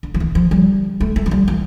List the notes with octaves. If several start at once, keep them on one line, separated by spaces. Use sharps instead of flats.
D3
F3
E3
F3
G3
A3
A3
F3
G3
E3